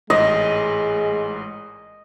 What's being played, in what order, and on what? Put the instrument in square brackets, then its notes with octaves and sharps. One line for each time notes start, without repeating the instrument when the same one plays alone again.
[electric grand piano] A1 G#2 [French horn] G#3 [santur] D#5